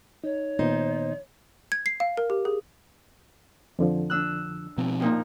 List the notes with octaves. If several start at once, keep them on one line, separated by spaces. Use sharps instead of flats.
D#4 C#5
A#2 D#3 B3 D#4 C5
G#6
C7
F5
A#4
G4
G#4
F2 D3 F3
D4 E6 F#6
B2 F3 C4
F2 A#2 D#4